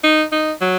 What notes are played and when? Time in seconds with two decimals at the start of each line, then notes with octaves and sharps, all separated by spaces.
0.04 D#4
0.32 D#4
0.61 F#3